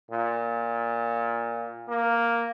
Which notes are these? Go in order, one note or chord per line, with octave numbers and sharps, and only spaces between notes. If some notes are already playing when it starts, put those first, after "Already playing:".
A#2
A#3